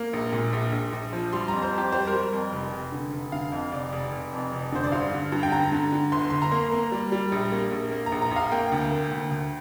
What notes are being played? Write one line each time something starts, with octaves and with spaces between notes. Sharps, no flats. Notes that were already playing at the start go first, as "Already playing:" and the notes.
Already playing: A#3
A#1
A#2
A#1
A#1
A#1
F3
G3 C6
F2 A#5
C5
F2
G4
G3 C5
A#4
G3
F2
F1
F1
D3
F1
D3 F5
F2 F5
F1 D5
F1
F1
F2
F1
D3 C5
D5
G2 F5
D3
G2
G5
D3 A#5
D3
D3
G1 C6
G1 C6
A#5
A#3
A#3
G3
G3
A#1
A#3
A#1
A#3
A#5
A#1
A#5
A#1 F5
A#3 G5
D2
A#3
D2
D2